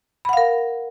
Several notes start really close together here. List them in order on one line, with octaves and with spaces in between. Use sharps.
B5 F#5 F5 A#4